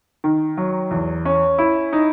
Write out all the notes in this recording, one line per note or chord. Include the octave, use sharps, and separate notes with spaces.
D#3
F#3
E2
C#4
E4
D#4